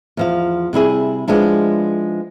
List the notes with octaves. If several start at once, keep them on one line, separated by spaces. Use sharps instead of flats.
E2 F3 F5
C3 G3 E4 G#4
F3 G#3 B3 D4 E4